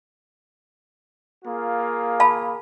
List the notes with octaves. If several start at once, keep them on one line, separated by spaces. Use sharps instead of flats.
A#3 F4 G#4
F5 A5 B5